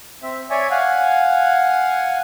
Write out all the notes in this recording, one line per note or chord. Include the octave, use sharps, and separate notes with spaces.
C4 E5
C#5 D5 E5 G#5
F5 F#5 G#5